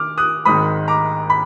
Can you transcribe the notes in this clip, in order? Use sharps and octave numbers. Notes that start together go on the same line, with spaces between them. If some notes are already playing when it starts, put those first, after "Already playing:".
Already playing: D#3 D6 F6
D#6 F#6
G#1 G#2 D#3 B5 D#6
A#5 D6
B5